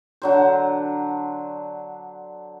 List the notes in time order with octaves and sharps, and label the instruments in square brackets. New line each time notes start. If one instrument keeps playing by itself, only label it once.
[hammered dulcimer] D3 F#3 C5